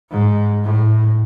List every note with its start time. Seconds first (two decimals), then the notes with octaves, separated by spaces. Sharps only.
0.11 G#2
0.64 A2